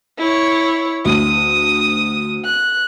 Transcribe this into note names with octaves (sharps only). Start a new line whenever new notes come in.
E4 C#5
D2 D#6 D#7
F#6